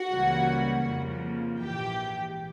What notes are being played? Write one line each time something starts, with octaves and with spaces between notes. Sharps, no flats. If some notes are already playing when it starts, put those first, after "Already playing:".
Already playing: F#4 F#5
C#2 C#3 E3 G3 A#3
F2 C#3 F3 A#3
A#1 G#2 E3 G4 G5